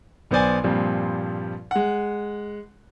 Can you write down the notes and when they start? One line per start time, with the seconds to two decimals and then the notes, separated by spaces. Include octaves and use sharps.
0.31 B1 B3 C5 D5 G#5
0.64 G2 A#2 F3 G3 C4
1.71 G#3 F#5